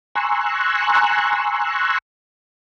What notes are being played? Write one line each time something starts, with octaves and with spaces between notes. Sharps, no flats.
G#5 A#5 C6 C#6 E6 F#6